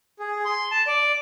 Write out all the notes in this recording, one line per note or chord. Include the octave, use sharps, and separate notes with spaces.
G#4
C6
A5
D5